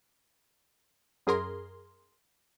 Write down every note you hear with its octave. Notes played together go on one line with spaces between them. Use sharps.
F#2 G#4 A#4 C6